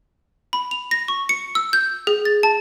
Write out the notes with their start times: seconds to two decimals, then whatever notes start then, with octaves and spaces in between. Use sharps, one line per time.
0.53 B5
0.71 F7
0.91 A#6
1.08 C#6
1.29 C#7
1.55 E6
1.73 G6
2.07 G#4
2.25 A6
2.43 A5